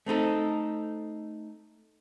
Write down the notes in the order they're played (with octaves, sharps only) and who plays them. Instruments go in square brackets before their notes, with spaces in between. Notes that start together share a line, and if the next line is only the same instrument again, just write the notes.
[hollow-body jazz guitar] A3 C4 D#4 A4